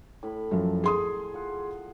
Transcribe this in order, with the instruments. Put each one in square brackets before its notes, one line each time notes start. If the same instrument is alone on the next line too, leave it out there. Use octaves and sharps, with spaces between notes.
[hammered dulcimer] A2 B5
[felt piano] F#2 F3
G#4 C6 D#6
[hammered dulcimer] F4 F#5